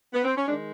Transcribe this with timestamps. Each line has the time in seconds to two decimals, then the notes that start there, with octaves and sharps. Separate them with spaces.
0.13 B3
0.24 C4
0.37 C#4
0.48 D#3 G#3 D4